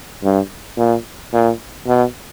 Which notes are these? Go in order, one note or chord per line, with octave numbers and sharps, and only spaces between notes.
G2
A#2
A#2
B2